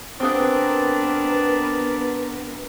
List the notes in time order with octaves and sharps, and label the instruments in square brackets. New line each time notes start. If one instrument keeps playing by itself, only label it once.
[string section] B3 A#4 B4 [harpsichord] C4 G#4 F#5 [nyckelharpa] D4